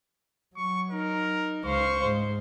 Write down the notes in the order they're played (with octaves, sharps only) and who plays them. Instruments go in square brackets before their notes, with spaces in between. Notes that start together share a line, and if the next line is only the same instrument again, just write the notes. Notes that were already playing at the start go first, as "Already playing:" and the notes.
[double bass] F#3 [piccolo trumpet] C#6
[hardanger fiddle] D#4 [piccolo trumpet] A#4
[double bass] C#2 [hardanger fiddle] C5 F5 [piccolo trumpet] C#6
[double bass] G#2 G#3 [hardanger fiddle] C5